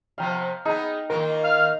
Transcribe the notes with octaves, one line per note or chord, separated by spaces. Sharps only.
C3 F3 B3 F5 G5 A#5
B3 D#4 G#4 A#5
D#3 A#3 F4 A#4
F5 F6